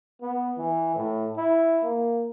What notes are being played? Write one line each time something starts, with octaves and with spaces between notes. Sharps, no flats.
B3
E3
A2
E4
A#3